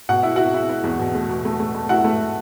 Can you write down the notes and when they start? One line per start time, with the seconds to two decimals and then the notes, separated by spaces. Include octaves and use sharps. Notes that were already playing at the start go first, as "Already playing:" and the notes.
0.09 B2 F#5
0.23 E4 E5
0.36 E4 F#4 F#5
0.54 E4
0.69 E4
0.84 E2
0.99 B2
1.15 A3
1.29 B2
1.45 A3
1.60 A3
1.75 A3
1.89 E4 F#4 F#5
2.04 A3